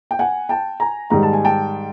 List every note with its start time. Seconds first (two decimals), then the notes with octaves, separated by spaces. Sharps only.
0.11 G5
0.19 F#5 G#5
0.49 G5 A5
0.80 G#5 A#5
1.10 G#2 D#3 G3 A#5
1.23 A5
1.33 G#5
1.45 G5 A5